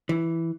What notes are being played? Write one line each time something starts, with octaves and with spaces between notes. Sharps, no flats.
E3